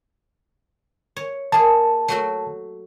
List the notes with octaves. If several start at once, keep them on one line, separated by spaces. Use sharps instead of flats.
C#5
A#3 G#4 A5
F#3 A3 F#4